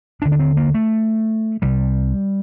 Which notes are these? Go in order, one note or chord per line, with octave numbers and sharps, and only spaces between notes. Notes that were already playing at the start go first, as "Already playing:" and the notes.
D#2 D3 D4
D4
C4
A#3
A3
C2 C3 G3